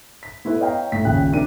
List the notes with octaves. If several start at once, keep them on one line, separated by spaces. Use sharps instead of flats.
B6
B3 E4 A4 B4
C#5 D#5 F5 G5 A#5
A2 B6
D#1 A#1 C#3 G5 F#6
C3 D4 A#4 D#7